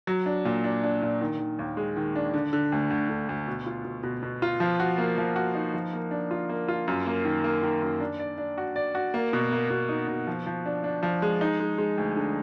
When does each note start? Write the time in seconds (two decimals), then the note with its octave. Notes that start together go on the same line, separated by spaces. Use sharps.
0.07 F#3
0.26 D4
0.45 A#2
0.64 D4
0.83 D4
1.02 A#2
1.21 D#3
1.40 D#3
1.59 D#2
1.77 G#3
1.96 D#3
2.15 D4
2.34 D3
2.53 D3
2.72 D2
2.90 D2
3.09 D3
3.29 D2
3.48 B2
3.66 F4
3.85 B2
4.03 B2
4.23 B2
4.42 F4
4.60 F3
4.80 F#4
4.98 A#3
5.18 F3
5.36 F#4
5.55 D#4
5.74 F3
5.93 A#3
6.11 D4
6.31 F4
6.49 A#3
6.68 F4
6.88 F#2
7.06 A#3
7.25 D#3
7.44 A#3
7.63 D#3
7.82 F#2
8.00 D4
8.19 D5
8.38 D4
8.58 F#4
8.76 D5
8.95 F#4
9.14 A#3
9.33 B2
9.52 A#3
9.70 B2
9.89 D#4
10.08 B2
10.27 F3
10.46 F3
10.66 D4
10.84 D4
11.03 F3
11.22 G#3
11.41 D#4
11.60 G#3
11.78 G#3
11.98 D2
12.17 D3